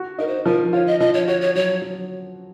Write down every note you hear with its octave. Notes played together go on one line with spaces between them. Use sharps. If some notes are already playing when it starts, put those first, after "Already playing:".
Already playing: F#4
D#4 A#4
C5
F3 A#4
F4 C#5
D#5
F3 D#5
C#5
F#4 C#5
C#5
F#3 C#5
F#3